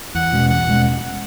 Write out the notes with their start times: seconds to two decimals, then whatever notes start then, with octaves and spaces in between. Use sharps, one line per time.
0.15 E2 F#5
0.32 B2 G#3 C#4
0.50 E2 F#5
0.67 B2 G#3 C#4